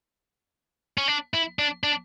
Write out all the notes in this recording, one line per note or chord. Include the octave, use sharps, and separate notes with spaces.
C#4
D4
E4
D4
D4